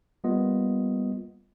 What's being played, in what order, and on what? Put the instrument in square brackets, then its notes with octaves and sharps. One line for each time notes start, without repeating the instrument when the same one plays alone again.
[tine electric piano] G3 A#3 B3 F4 D#5